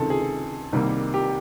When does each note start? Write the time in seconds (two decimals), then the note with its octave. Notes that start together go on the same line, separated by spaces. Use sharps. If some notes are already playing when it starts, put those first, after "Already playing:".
Already playing: C#2 C3 D#3 A4
0.10 G#4
0.73 C2 C3 D#3 G3 A#3
1.14 G4